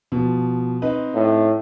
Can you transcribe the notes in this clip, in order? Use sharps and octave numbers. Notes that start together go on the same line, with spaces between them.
B2 F3
C4 D#4 B4
A2